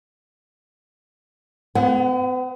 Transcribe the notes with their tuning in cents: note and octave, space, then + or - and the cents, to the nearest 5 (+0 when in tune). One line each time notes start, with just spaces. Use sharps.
B3 +45 F#5 +0